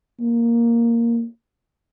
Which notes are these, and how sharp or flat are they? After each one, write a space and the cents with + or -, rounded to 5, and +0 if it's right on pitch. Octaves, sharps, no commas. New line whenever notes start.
A#3 +0